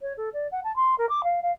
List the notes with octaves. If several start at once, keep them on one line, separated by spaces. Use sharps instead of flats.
C#5
A4
D5
F#5
A5
C6
A#4
D6
F5
F5